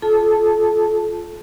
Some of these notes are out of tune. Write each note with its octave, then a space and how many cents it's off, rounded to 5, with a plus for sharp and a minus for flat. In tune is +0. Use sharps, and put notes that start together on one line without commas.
F4 +0 A4 -30 A5 -5